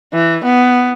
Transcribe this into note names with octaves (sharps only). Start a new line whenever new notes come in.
E3
B3